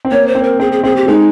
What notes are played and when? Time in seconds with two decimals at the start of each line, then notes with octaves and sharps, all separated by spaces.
0.05 C4
0.11 A#3 C#5
0.27 C5
0.35 C4
0.43 A#4
0.60 C4 G#4
0.72 G#4
0.83 C4 G#4
0.96 G4
1.07 G#3 D#4